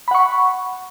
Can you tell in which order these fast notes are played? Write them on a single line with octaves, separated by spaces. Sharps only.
B5 F#5 C#6